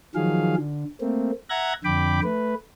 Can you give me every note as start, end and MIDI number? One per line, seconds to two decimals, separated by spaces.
0.15 0.55 51
0.15 0.55 53
0.15 0.55 54
0.15 0.55 68
0.15 0.55 77
0.56 0.84 50
1.01 1.31 57
1.01 1.31 58
1.01 1.31 60
1.50 1.73 76
1.50 1.73 78
1.50 1.73 82
1.50 1.73 90
1.50 1.73 92
1.50 1.73 94
1.84 2.20 41
1.84 2.20 50
1.84 2.20 79
1.84 2.20 83
1.84 2.20 86
2.23 2.55 57
2.23 2.55 71